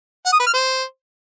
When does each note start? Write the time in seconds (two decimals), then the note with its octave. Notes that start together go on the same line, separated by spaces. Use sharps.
0.26 F#5
0.33 D#6
0.39 B4
0.46 F6
0.53 C5